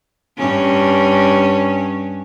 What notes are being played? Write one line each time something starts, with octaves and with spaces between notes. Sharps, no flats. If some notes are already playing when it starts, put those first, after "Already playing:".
G2 C#4